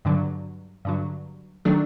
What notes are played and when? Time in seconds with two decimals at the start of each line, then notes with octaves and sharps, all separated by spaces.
0.05 G2 D3 F#3
0.85 G2 D3 F#3
1.65 D#3 F#3 A3 D4